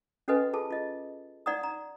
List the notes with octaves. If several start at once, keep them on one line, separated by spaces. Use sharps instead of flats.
C#4 F#4 A4 B4 D#5 G#5
F4 G#4 A4 A5
F4 D#5
D#4 D5 F#5 A#5 D#6
A#5